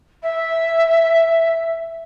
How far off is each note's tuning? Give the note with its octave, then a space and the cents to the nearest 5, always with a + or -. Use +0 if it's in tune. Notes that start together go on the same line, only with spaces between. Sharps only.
E5 +0